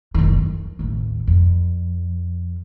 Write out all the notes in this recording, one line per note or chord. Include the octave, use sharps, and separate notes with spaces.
F#1 D#3
F2
A1 D#2
F2